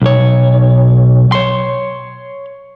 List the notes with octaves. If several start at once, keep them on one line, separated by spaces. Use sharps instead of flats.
B1 C#5
C#5 C6